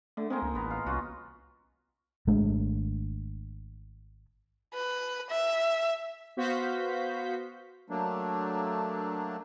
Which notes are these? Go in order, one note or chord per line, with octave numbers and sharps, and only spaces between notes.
D3 A3
G#3 A#3 C4 D#4
C#2
A1 B3 A#5
F5
C2 C#4 F4 F#4
G#1 G#3 A3 D4
B4
E5
B3 F#4 C5 F5 G6 B6
F#3 A3 A#3 D4